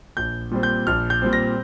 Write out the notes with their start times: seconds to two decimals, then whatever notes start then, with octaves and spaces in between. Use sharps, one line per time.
0.17 A#1 G6
0.51 A#2 G3 C4
0.63 G6
0.87 A#1 F6
1.10 G6
1.22 A#2 G3 C4
1.33 A#6